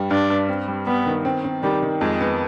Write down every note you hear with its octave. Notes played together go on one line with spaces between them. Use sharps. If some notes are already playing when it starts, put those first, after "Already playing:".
Already playing: G2 G3
G2 D4
G2
C4
G3
G3 B3
D#3
C4
C4
D#3 G3
D#3
F2 G#3
B3